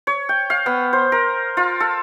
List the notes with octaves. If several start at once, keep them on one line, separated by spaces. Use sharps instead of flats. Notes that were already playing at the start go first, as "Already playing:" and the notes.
C#5
G5
F5
B3
C5
A#4
F4
A4